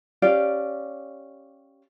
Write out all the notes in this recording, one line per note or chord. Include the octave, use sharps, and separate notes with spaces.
C#4 G4 D5 F5